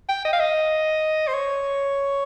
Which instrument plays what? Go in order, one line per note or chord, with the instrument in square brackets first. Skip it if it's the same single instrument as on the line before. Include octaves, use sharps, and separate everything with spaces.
[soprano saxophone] G5
D#5
F5
D#5
C5
C#5